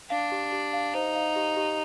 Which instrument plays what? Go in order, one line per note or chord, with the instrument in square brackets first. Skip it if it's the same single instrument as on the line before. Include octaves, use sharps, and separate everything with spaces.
[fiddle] D4 [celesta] F5
[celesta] G4
G4
F5
[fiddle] D#4 [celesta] C5
[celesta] F5
G4
G4